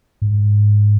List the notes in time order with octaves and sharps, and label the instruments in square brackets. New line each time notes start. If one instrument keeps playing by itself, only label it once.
[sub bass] G#2